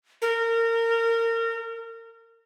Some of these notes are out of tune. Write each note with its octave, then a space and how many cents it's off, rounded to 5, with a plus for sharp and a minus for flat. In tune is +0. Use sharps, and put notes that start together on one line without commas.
A#4 -25